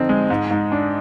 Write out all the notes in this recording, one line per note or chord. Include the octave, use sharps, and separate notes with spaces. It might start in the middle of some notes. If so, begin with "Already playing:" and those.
Already playing: D3 F3 C4 D#4
G#3
G#2
G#2
D4